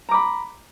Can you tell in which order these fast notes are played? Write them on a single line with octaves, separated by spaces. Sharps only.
A#5 D6 B5